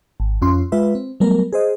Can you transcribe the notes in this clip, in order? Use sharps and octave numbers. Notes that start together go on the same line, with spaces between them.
G#1
F2 C#4 F4 C6
G#3 F4 B4 E5
C4
F#3 G3 A3 B3 A#4
G#4 C5 D#5